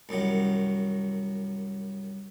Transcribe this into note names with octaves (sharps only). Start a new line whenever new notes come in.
C2 F#2 D#3 F#3